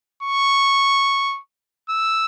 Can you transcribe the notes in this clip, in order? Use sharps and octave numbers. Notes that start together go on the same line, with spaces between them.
C#6
E6